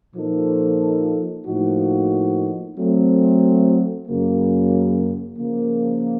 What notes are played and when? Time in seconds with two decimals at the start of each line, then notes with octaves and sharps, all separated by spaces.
0.15 A#2 F3 A#3 D#4 A4
1.46 A2 F3 A#3 D#4 F#4
2.77 F#3 A3 C4
4.08 F#2 C#3 F#3 A#3
5.39 C#3 F3 A#3